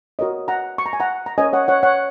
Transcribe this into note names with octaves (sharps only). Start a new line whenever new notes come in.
F#4 A#4 C#5 D#5
F#5 A#5
C#6
A#5
G#5
F#5 A#5
A#5
C#4 A#4 C#5 D#5 G#5
C#5 F#5
C#5 F#5
C#5 F#5